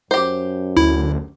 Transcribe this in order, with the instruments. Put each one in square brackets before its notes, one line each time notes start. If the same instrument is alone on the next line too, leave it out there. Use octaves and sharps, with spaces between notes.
[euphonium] F#2 [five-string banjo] G4 C5
[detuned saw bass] D2 [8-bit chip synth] E4